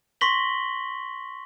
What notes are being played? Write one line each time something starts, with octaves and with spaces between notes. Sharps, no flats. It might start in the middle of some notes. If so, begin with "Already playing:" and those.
C6 C#6 A#6 B6 F#7 G7